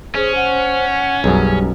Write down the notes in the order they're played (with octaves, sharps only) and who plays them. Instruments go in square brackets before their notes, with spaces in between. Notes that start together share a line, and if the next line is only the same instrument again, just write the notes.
[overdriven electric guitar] C#4 [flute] G#4 [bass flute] C5
[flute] F#5
[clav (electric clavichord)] B1 F#2 [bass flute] G3 [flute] G#4